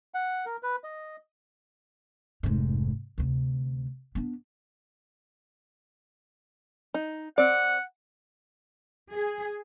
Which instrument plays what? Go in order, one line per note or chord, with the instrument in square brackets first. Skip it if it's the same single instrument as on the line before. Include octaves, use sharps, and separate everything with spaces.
[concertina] F#5
A#4
B4
D#5
[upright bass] F1 G#2
D2 C3
B3 D4
[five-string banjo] D#4
[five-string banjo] C4 D5 [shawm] F#5
[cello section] G#4